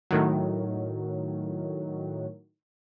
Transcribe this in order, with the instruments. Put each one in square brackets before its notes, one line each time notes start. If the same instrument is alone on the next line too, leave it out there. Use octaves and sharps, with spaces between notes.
[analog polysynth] A2 D#3 F#3